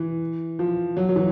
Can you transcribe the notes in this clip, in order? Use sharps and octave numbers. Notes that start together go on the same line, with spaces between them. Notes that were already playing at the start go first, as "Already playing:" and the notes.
Already playing: E3
F3
F#3
F#3
E3